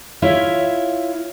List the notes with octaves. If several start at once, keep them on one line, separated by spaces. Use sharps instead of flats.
E4 F4 C#5 E5